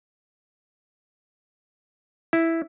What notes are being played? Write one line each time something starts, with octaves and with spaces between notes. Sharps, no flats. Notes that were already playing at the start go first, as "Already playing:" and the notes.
E4